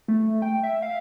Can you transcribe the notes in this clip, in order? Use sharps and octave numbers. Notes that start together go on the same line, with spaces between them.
A3
G5
E5
F5